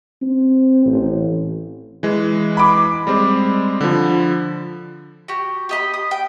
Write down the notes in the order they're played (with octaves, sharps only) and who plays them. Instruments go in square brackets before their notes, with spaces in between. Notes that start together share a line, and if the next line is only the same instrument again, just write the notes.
[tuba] C4
A1
[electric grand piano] E3 G#3
[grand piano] B5 D6
[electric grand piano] G3 G#3 C4
D3 F3
[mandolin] F#4 G4
G4 D#5 B5
D#6
G5